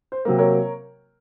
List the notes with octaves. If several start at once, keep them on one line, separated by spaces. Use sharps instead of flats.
C5
C3 F#3 A#3
A#4 C#5